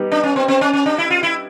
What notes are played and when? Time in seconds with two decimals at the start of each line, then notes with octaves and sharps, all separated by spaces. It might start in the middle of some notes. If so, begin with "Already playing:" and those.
Already playing: G3 B3 D#4 G4
0.12 D4
0.23 C#4
0.36 C4
0.48 C4
0.61 C#4
0.73 C#4
0.86 D4
0.98 E4
1.10 F4
1.23 E4